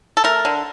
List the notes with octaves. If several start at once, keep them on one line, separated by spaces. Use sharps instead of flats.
A4
A3 A#4
D3